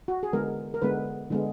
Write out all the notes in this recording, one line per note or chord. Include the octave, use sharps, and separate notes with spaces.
F#4
G#4
D3 G#3 B3 A#4
A#4
D3 G#3 B3 B4
D3 G#3 B3